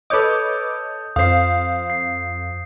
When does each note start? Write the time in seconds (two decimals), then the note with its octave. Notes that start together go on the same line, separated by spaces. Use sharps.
0.10 A4 B4 C#5 D#5 D6 D#6 G6
1.16 F2 C5 F5 D#6 C7
1.90 C7